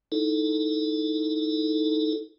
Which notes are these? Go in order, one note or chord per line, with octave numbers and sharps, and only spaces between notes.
D#4 E4 A4